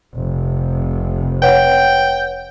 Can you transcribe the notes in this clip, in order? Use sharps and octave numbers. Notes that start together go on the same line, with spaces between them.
F1 C3
B4 C#5 F#5 G5